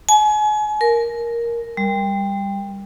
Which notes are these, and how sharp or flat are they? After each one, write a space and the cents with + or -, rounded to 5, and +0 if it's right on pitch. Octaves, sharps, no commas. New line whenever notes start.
G#5 +35
A#4 +5
G3 +15